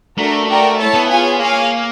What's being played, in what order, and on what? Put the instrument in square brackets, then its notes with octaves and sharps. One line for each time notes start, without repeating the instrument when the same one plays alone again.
[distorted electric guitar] A3 [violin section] D4 F#4 A#4
[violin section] F#4 A#4 D5 G5
E4 A4 C#5 E5 A5
[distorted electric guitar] B3
[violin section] F4 G#4 C#5 F5 G#5
[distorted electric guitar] A#3 [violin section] G#4 C#5 F5 G#5